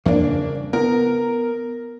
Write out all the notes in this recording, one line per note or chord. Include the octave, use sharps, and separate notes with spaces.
E2 G2 F3 A#3 D4
C#3
B3 A#4